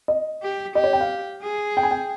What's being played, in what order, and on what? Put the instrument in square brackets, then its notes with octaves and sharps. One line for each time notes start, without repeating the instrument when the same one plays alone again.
[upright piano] D#5
[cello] G4
[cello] G4 [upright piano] D#5
[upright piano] C#5
G5
F5
[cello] G#4
[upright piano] G5
G#5
G5